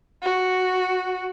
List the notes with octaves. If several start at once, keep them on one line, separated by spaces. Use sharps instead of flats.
F#4